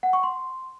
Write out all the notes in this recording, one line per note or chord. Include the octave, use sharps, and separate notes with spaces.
F#5
C#6
C6